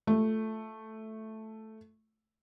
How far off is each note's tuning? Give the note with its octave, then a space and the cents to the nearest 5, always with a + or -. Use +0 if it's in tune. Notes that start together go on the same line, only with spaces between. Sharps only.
A3 +0 F4 +0